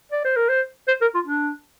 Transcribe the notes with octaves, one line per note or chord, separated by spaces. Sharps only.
D5
C5
A#4
C5
C5
A#4
F4
D4